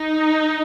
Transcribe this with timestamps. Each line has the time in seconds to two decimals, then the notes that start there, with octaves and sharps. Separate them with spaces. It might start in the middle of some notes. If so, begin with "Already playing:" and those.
Already playing: D#4